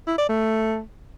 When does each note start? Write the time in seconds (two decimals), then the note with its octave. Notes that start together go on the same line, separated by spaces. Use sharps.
0.07 E4
0.18 D5
0.29 A3